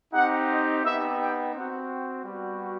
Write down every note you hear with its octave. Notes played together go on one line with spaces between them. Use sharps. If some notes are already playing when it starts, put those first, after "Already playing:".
C4 D#4 G4 F#5
D#5
B3 D#4 G4 E5
G5
C4 F#4 F#5
G5
G3 B3 F#4